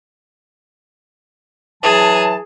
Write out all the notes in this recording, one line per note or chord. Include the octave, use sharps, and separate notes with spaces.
E3 F#3 G#4 A5